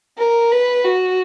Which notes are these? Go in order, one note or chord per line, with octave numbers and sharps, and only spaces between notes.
A#4
B4
F#4